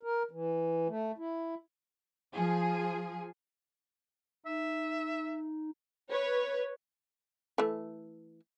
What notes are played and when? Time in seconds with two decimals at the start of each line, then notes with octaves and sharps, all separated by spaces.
0.03 A#4
0.31 E3
0.89 A3
1.18 E4
2.33 F3 G#4
4.46 D#4 E5
6.10 B4 C#5
7.58 E3 A3